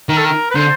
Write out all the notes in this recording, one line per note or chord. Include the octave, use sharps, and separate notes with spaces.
D#3 A#4
A4
A#4
B4
D3 C5